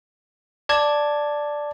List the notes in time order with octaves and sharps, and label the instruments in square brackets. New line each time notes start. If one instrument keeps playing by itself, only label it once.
[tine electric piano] D5 A5 G#6